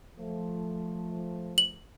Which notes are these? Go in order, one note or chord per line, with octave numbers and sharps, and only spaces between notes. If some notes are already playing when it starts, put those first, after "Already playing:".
F3 A3
F#7